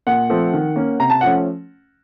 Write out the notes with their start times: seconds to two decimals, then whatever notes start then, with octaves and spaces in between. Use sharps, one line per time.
0.07 A#2 F#5
0.30 F3 A3 C4
0.53 D#3
0.76 A#3 C#4
0.99 C3 A#5
1.10 A5
1.21 F3 A3 C#4 F#5